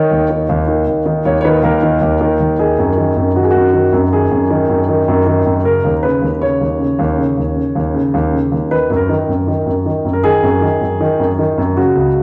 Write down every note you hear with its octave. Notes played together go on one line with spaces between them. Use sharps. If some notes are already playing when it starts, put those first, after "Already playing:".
Already playing: D#3 C#5
D#2
D#3
D#2
D#3
D#2
D#3
D#2 C#5
C#5
D#3 B4
D#2 A#4
D#3
D#2
D#3
D#2
D#3 G#4
F#2
D#3
F#2
D#3 F#4
G#4
F#2 F#4
D#3
F#2
D#3 G#4
F#2
D#3
F#2
D#3
F#2
D#3
F#2
C#3 A#4
D#2
C#3 B4
D#2
C#3 C#5
D#2
C#3
D#2
C#3
D#2
C#3
D#2
C#3
D#2
C#3
D#2
D#3 B4
F#2
A#4
D#3
F#2
D#3
F#2
D#3
F#2
A#4
D#3 G#4
F#2
D#3
F#2
D#3
F#2
D#3
F#2
C#3 F#4
C#2